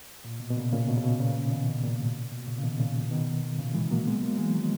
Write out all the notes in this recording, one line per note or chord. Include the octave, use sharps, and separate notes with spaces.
A#2
B2
B2
A#2 C#3
A#2 C#3
B2
C#3
B2
A#2 C#3
B2
C#3
B2 D#3
B2
A#2
G#2
B2
A#2 C#3
C#3
B2 D#3
A#2 C#3
B2 D#3
A#2 C#3
E3 G#3
F#3 A#3
G#3 B3
F#3 A#3
E3 G#3
D#3 F#3